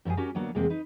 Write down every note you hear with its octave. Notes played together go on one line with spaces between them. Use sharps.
F#2 F3 F4 G4 G#4
C#4 F#4 G4 A#4
D2 F#3 A#3 B3 D4 F#4
E2 C3 G#3 A#3 C4
D#4 B4